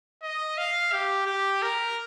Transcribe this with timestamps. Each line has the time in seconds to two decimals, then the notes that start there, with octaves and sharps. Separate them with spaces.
0.22 D#5
0.58 F5
0.92 G4
1.26 G4
1.62 A#4